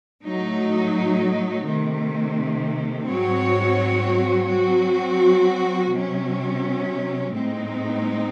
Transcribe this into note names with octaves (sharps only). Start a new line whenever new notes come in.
A2 F#3 A3 D#4
C3 D#3 A3
G#2 F#3 C4 F#4 C#5
F#3 C4 F#4
C3 F#3 C#4
A2 G#3 C4 D#4